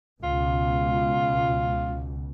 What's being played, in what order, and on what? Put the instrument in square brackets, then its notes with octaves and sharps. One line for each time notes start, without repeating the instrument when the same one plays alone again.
[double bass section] C#2 B2 [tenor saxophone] F4